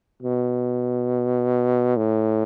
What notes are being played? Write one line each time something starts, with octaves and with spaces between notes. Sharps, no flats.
B2
A2